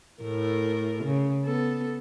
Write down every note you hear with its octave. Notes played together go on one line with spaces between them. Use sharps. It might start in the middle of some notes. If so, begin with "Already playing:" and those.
A2 A3 A#4
C#3
B3 A4